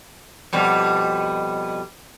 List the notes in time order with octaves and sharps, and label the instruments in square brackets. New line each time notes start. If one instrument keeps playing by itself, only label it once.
[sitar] F2 B2 G3